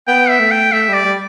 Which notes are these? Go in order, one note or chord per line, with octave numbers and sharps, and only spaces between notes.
B3 G5
E5
A3
G5
A3 E5
G3
D5
G3